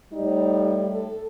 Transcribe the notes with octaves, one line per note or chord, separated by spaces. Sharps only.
A2 G3 D#4
A4